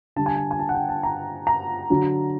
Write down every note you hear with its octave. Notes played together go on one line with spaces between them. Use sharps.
D3 G3 A5
G#5
A5
G#5
A5
F#5
G5
A5
A#5
A#5
D3 F#3